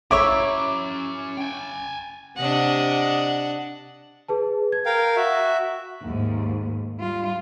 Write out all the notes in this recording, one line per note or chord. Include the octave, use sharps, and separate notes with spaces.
C#4 E4 C#5 E5 A#5 D6
G5 G#5
C3 D4 D#5 F#5
G#4 B4 A5
G#6
A#4 F5 G5
F#4 E5
D#2 G#2
G3 F4